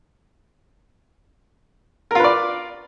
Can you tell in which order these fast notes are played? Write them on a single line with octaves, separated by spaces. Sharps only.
A#4 F4 B4 D5